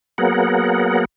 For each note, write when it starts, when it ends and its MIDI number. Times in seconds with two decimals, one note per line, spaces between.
0.18 1.05 54
0.18 1.05 58
0.18 1.05 59
0.18 1.05 68
0.18 1.05 70
0.18 1.05 78